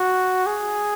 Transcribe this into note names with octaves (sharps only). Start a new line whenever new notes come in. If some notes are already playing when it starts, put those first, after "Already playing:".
Already playing: F#4
G#4